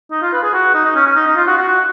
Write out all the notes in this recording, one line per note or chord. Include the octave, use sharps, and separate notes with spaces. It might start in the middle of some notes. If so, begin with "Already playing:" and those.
D#4
F4
B4
G#4
F#4
D#4
D#4
C#4
C#4
D#4
D#4
F4
F#4
F#4
F#4